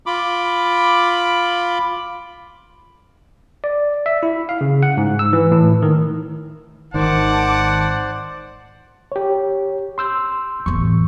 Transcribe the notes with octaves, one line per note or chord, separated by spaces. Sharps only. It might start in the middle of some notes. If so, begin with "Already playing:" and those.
F4 B5 D6
D5
E5
E4
F5
C#3
F#5
G#2
E6
E3
A2
D#3
G#1 D#3 C5 D5 F#5 A5 D6
G4 C#5
C6 E6 G6
A1 E2 C#6